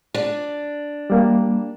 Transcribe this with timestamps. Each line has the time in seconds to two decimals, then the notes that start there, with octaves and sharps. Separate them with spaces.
0.14 D4
1.10 G3 A#3